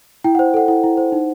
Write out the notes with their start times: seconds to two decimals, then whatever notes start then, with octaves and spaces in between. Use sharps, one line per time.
0.24 E4 G5
0.35 F#5
0.39 C5
0.54 A4 F#5
0.68 E4 F#5
0.84 E4
0.97 C5
1.12 D#4